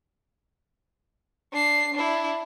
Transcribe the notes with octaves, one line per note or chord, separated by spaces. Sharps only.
D4 C7
D4 E4